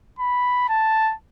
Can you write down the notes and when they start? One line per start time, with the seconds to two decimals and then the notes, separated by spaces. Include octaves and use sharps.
0.19 B5
0.69 A5